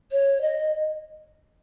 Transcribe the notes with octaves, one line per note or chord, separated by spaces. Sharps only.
C#5
D#5